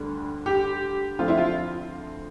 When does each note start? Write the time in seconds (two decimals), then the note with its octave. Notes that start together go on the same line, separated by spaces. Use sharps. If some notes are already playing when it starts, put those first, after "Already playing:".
Already playing: D2 D3 G3
0.46 G4
1.19 D2 D3 F3 A3 C4 F4
1.28 E4
1.37 F4